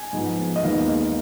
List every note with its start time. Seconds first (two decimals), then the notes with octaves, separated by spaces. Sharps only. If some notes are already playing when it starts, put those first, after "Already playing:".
Already playing: G#5
0.13 G#2 F3 B3
0.56 D#5
0.62 D#2 D#3 G#3 B3 F5